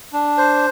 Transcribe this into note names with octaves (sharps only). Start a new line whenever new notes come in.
D4
C5